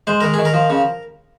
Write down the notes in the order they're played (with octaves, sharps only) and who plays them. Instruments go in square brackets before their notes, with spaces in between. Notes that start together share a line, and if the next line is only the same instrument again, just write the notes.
[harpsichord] G#3 C5
D#3 A#4
D#3 G#4
A#4
F3
C#3